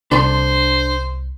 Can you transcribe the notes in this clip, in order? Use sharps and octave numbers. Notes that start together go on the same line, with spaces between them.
C2 D4 A4 C5 C6